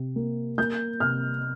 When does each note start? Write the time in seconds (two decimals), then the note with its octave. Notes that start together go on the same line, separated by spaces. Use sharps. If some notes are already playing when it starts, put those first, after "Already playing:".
Already playing: C3
0.16 A#3
0.58 A#3 G6
1.00 C3 F6